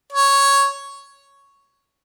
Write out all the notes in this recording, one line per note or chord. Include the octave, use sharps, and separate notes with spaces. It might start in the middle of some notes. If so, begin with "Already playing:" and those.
C#5